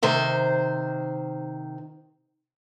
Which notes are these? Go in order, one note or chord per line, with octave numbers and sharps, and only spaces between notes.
C3 D#3 C5